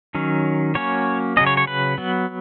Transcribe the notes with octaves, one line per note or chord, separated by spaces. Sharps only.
D#3 F#3 C#4
F#3 A#3 C#4 C#5
C#3 F#3 C#4 D#5
C#5
C#5
B4
F#3 B3